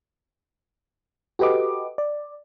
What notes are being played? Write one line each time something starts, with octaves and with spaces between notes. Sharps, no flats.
F#4 G4 A4 B4 D#5 D6
D5